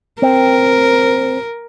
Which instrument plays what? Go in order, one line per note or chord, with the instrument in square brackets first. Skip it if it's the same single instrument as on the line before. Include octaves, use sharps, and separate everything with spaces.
[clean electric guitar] C4 [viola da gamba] A#4